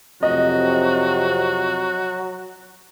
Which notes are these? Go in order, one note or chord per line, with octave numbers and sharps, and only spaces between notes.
F2 C3 F#3 F#4 D#5